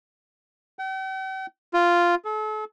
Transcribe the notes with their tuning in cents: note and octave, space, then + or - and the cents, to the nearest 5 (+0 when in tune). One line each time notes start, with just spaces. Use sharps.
G5 -45
F4 -5
A4 -40